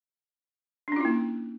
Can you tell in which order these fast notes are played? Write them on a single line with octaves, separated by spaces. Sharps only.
D4 C#4 F4 E4 A#3